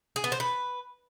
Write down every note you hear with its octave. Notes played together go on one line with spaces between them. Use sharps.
G#4
B3
C5
B4